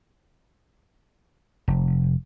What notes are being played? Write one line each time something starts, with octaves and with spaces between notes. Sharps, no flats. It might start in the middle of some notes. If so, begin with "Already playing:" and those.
F1